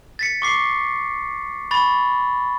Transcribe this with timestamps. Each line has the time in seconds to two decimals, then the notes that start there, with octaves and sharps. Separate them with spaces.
0.19 A6 B6 C#7
0.42 C#6 D6 C7
1.71 B5 C#6 A6